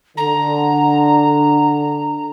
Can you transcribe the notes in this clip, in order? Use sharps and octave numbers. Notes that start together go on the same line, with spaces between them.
D3 A#5